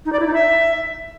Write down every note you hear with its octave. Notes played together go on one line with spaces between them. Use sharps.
D#4
D5
E4
D#4
E5